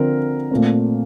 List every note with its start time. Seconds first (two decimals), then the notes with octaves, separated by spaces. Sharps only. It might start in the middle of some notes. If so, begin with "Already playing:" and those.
Already playing: D3 F3 C4 A#4
0.51 A#2 A3 C4